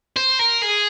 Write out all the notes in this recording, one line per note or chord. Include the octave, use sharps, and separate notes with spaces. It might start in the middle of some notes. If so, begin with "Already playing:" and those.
C5
A#4
G#4